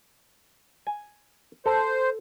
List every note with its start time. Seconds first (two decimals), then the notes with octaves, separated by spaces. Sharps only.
0.87 G#5
1.66 A4 C5